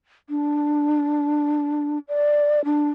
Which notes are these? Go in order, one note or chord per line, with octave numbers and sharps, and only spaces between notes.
D4
D5
D4